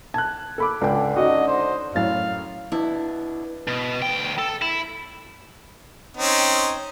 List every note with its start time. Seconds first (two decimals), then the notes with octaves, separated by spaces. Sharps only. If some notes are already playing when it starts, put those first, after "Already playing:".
0.14 A5 F#6 G#6
0.58 A4 B5 D6
0.81 C#2 D3 G5
1.16 C#4 D#4 F#4 D#5
1.47 C5
1.95 F#2 A2 F5 A6
2.72 B2 D4 E4
3.68 B2
4.02 D2 G5
4.38 A4
4.62 E4
6.17 C4 C#4 D#4